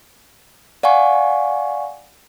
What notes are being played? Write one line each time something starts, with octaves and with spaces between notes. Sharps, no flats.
D5 F5 F#5 G#5 C#6